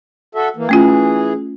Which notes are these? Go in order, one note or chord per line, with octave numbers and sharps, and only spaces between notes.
F#4 A4 E5
E3 A#3
E3 A3 C#4 F4 G#4